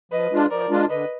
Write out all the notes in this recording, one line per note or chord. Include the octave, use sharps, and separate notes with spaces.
F3 B4 D#5
G#3 D4 F4
F3 A#4 D5
G#3 D4 F4
D3 B4 D#5